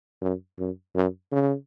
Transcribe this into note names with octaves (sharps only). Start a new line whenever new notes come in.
F#2
F#2
F#2
C#3